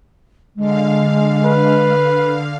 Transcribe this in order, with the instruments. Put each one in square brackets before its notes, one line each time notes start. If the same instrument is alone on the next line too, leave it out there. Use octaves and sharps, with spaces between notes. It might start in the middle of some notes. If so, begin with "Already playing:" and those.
[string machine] D3 F5 [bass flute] G#3
[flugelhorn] B4